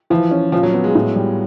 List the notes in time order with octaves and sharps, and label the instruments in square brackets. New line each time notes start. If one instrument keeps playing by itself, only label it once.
[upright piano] E3 [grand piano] F3
[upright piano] C#4
[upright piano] A#2 [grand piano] F3
[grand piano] F#3
[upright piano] B3
[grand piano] G#3
[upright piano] A2
G3